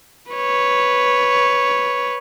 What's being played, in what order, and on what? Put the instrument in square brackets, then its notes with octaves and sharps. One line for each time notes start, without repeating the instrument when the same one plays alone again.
[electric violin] B4 C#5